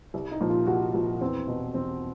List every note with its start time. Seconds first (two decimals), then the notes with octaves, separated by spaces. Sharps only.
0.14 C2
0.32 D#4
0.41 A#2 F3
0.50 F4
0.67 C2 F#4
0.94 A#2 F3
1.21 E2 C4
1.48 B2
1.74 E2 C4